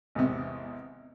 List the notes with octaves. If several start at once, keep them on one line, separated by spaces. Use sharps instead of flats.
G#1 E2 C3